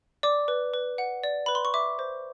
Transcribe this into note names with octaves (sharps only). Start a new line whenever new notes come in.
D5 D6
B4
B4
F#5
D5
B4 B5
C6
C#6
E5 D6
C5